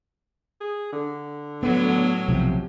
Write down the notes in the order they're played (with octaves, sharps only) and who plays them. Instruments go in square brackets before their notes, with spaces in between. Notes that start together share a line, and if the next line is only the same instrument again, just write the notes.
[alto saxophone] G#4
D3
[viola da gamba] A2 F#3 [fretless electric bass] B3
[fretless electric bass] B1 C3 F3